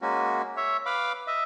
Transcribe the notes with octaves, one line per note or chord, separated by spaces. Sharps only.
G#3 A#3 C#4 F#4
C#5 E5
B4 F5 B5 D6
D#5 E5